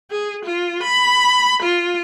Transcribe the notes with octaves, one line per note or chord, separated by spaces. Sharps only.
G#4
F4
B5
F4